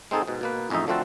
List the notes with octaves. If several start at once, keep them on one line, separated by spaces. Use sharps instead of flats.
G#3 C4 D#4 G#4 A4
G#2 B2
B2 A#3 B4
A1 F2 G#3 D#4 E5
D3 F3 A3 C4 F#4 A4